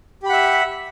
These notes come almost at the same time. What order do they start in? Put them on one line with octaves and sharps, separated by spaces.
G4 B5 F#5 E5